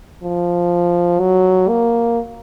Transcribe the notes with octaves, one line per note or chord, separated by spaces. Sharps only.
F3
F#3
A#3